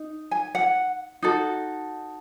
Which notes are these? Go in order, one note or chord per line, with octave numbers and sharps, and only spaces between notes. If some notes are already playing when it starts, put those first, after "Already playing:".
Already playing: D#4
G#5
F#5
D#4 F#4 A4